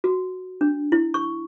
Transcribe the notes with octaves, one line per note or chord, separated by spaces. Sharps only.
F#4
D4
E4
C#6